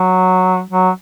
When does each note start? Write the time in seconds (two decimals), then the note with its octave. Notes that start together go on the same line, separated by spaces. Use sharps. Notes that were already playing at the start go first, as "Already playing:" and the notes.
Already playing: F#3
0.70 F#3